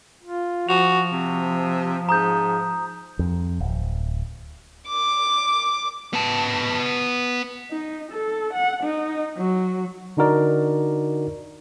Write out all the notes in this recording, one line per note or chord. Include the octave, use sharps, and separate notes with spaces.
F4
F3 F#4 F7
C3
G#2 A#5 D#6 G6
F2
D1
D6
B3 A5
D#4
A4
F#5
D#4
F#3
D3 D4 D#4 F#4 A#4 D5